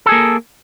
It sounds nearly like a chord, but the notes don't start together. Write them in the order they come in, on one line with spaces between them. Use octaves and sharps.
A4 G#4 A#3